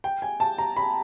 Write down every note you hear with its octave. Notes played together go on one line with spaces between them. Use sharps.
G5
G#5
A5
A#5
B5